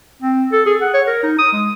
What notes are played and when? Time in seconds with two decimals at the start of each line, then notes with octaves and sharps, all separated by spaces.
0.22 C4
0.52 A4
0.66 G#4
0.82 F#5
0.94 C#5
1.07 A#4
1.23 D#4
1.38 D#6
1.53 G#3